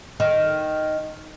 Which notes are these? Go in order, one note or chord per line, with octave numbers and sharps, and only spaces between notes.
D#3